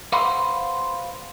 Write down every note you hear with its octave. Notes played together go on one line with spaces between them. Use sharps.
B4 C5 F5 F#5 B5 C6